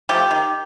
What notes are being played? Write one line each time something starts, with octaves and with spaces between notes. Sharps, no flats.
F3 A3 G4
D#3